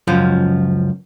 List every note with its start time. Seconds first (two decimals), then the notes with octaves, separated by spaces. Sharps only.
0.07 C#2 F#2 F3 C#4